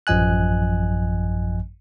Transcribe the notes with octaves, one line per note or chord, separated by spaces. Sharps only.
A1 F#2 F3 D#5 G#5 F#6